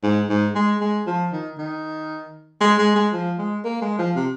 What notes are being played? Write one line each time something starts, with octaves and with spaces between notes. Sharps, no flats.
G#2
G#2
G#3
G#3
F3
D#3
D#3
G#3
G#3
G#3
F3
G#3
A#3
G#3
F3
C3